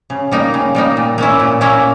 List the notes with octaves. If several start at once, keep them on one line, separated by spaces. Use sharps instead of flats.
C#3
G3 A#3 D#4
C#3
G3 A#3 D#4
A#2
A#3 C#4 E4
A#2
A#3 C#4 E4